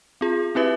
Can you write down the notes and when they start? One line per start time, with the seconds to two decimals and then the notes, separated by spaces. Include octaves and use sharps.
0.21 C4 F4 G#4
0.55 C4 E4 G4 B4 E5